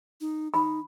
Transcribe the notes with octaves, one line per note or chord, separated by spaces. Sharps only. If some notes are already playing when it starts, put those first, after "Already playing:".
D#4
D#4 B5